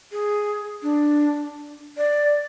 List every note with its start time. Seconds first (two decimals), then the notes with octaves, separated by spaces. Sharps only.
0.12 G#4
0.82 D4
1.97 D5